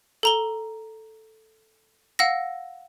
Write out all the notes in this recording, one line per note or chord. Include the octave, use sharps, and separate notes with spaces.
A4 A#5 G7
F5 F#5 E6 A#6